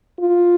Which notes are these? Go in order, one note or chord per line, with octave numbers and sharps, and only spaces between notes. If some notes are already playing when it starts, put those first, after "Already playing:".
F4